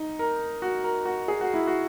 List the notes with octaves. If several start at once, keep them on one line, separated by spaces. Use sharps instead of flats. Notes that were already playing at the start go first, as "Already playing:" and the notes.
Already playing: D#4
A#4
F#4
A#4
F#4
G#4
F#4
E4
F#4